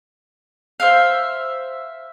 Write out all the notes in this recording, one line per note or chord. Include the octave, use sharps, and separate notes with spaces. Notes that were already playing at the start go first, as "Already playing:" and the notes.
C5 E5 F5